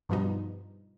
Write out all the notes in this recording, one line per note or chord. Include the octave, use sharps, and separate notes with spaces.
G2 B2 F3 G3 B3 D#4